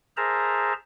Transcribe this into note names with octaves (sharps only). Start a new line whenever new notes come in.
G#4 A#4 C5 E5 A5 A#5